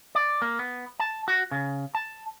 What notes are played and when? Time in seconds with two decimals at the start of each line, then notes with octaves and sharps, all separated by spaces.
0.15 D5
0.42 A#3
0.59 B3
1.00 A5
1.28 F#4
1.51 C#3
1.95 A5